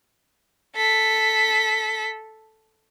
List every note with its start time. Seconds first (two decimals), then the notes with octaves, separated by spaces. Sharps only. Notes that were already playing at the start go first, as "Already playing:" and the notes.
0.76 A4 B6